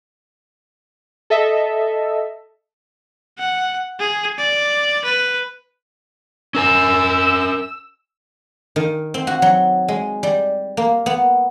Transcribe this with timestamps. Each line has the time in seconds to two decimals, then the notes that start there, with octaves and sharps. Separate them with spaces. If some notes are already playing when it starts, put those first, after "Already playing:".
1.30 A4 D#5 E5
3.39 F#5
4.00 G#4
4.38 D5
5.05 B4
6.55 C#4 A#4 G#5 E6
8.76 D#3
9.14 C4
9.27 F#4
9.42 F#3
9.88 G#3
10.23 G3
10.77 A#3
11.06 B3